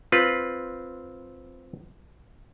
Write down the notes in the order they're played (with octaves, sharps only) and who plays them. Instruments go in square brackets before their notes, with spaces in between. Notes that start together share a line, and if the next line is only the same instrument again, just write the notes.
[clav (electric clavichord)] C4 F4 B4